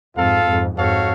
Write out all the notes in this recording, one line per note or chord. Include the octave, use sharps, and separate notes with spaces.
F2 G#2 F4 A4 F5
F2 G#2
F2 G#2 F#4 A4 C#5 F5